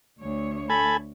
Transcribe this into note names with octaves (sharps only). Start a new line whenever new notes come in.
D2 C#5
A4 G#5 B5